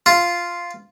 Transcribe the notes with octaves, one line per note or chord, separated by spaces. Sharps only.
F4